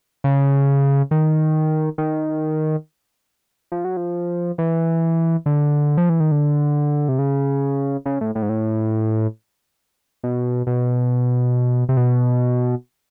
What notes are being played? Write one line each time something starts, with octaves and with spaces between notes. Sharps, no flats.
C#3
D#3
D#3
F3
F#3
F3
E3
D3
F3
E3
D#3
D3
C3
C#3
C#3
A2
A2
G#2
A2
B2
B2
C3
B2